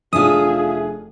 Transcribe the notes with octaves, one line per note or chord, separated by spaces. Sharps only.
F1 D4 F4 G#4 E5 F5 D#6